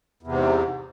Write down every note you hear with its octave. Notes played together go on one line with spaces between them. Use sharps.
E2 G#2 C3